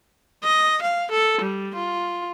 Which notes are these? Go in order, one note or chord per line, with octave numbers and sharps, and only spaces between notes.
D#5
F5
A4
G3
F4